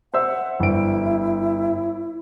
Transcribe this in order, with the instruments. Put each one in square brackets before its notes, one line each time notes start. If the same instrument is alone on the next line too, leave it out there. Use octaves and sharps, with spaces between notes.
[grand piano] C5 E5 E6 [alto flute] F#5
[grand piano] G1 D7 [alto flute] E4